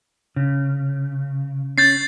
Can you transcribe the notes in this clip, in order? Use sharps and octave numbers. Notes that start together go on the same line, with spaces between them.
C#3
C#4 G6 A6 C7